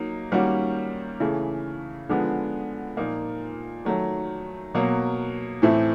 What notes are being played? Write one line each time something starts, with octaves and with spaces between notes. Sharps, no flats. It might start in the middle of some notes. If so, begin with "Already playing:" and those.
Already playing: F#3 A#3 D#4
D#3 G3 A#3 C#4 F#4
C#3 E3 A3
D3 F3 G#3 B3
A#2 F3 A#3 D#4
D#3 F#3 A3
B2 F#3 A#3
A2 E3 A3 C4